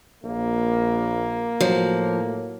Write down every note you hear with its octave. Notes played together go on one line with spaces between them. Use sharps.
A#1 A#3
A2 F3 F#3